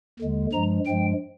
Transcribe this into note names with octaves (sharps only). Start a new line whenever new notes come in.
D#2 D3 G#3
G2 F3 G#3 A#5
G2 F3 G#3 G5